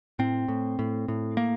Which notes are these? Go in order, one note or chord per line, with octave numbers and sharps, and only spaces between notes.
A2 C4
A2
A2
A2
A#3